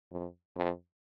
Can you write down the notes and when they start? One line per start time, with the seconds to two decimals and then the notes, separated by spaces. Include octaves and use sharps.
0.12 F2
0.56 F2